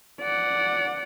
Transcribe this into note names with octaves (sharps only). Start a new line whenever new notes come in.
D5 F#5